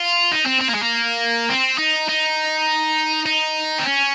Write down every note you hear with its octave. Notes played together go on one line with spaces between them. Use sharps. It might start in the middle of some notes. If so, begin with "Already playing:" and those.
Already playing: F4
D#4
C4
C4
A#3
G#3
A#3
C4
D#4
D#4
D#4
C4
C#4